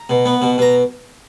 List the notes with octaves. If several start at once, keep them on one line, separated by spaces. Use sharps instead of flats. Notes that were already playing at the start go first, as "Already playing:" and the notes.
Already playing: A#5
B2
B3
B2
B2 A#5